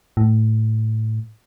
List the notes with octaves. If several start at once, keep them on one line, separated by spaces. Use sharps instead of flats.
A2